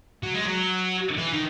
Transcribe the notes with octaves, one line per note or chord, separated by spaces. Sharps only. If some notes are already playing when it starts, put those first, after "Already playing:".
F#3
G#3
F#3
E3
D#3